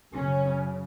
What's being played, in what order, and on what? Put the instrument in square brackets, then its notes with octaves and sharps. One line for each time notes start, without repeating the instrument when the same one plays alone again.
[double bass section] F#2 C#3 C#4